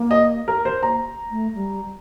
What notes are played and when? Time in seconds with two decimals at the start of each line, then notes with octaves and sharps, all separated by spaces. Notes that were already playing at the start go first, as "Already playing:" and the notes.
Already playing: A#3
0.11 D#5
0.48 A#4
0.65 C5
0.82 A#3 A#5
1.31 A3
1.55 G3